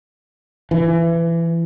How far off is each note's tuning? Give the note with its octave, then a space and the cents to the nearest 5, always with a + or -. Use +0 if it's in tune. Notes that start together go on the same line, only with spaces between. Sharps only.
E3 +25